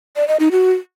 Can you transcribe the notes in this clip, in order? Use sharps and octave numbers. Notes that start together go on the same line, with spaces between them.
D5
D#5
D#4
F#4